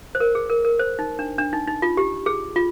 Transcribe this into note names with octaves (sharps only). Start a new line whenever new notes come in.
C5
A#4
G#4
A#4
A#4
C5
D#4
D4
D4
D#4
D#4
F4
G4
G#4
F4